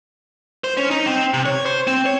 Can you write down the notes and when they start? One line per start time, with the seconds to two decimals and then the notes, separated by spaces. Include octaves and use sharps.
0.64 C5
0.77 C#4
0.91 D#4
1.07 C4
1.34 C3
1.46 C#5
1.66 C5
1.87 C4
2.06 C#5